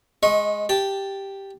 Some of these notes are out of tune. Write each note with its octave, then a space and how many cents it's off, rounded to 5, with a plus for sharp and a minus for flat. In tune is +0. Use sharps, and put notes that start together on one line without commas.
G#3 +0 D#5 +25 C#6 -25
G4 +0 A5 +0